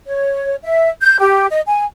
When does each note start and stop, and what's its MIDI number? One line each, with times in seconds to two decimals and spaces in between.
0.07 0.55 73
0.63 0.89 76
1.02 1.18 91
1.20 1.46 67
1.50 1.60 75
1.67 1.83 80